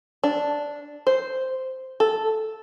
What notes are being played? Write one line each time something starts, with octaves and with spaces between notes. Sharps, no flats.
D4
C5
A4